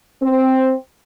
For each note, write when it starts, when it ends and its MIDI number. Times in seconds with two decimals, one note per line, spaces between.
0.22 0.72 60